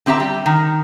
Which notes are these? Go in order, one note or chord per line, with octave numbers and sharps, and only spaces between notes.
D3 C4 G4 E5 A#5
G3
D#3